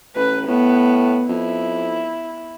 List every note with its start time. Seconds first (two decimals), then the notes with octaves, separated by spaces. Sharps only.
0.15 A1 B4
0.48 A2 B3
1.28 F2 E4